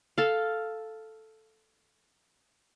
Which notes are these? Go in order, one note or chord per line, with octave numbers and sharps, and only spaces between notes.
A4 F5